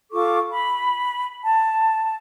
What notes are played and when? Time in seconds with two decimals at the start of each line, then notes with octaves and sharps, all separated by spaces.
0.12 F4 A4 C#6 D6
0.51 B5
1.43 A5